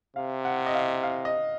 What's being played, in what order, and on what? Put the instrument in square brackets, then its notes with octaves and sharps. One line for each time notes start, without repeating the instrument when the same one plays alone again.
[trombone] C3 [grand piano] F5
[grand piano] F#5
D#5
F5
F5
D#5